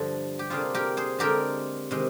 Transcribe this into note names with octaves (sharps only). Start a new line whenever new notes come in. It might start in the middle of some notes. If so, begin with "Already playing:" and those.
Already playing: G2 D3 F3
G4
C3 G3 A#3 D4 F4 G#4
G4 A#4
G#4 C5
D3 G#3 C4 G4 A#4
C3 D#3 G#3